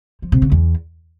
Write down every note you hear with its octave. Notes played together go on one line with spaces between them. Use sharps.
F3
C3
C#3
E2